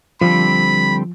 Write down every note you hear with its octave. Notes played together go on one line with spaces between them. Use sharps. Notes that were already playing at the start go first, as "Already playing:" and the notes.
D3 F3 G3 C4 B5